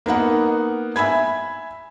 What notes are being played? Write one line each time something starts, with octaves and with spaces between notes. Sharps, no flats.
A#3 B3 D#4 F#5
E5 G#5 B5 G#6